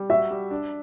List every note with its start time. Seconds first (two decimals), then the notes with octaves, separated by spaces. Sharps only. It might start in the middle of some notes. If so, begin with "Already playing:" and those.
Already playing: G3
0.10 F#4 E5
0.31 G3
0.51 D4